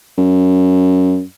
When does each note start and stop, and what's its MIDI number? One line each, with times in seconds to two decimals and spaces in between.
0.18 1.22 42